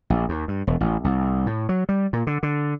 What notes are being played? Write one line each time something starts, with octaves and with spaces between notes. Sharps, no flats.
A#1
D#2
G2
E1
A1
C2
A2
F#3
G3
A#2
D3
D3